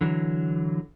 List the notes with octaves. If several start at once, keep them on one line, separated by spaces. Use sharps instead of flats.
D3 E3 F#3